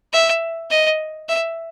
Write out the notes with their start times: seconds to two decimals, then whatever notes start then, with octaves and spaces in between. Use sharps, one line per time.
0.13 E5
0.70 D#5
1.29 E5